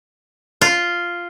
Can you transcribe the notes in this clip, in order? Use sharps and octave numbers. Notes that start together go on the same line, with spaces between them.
F4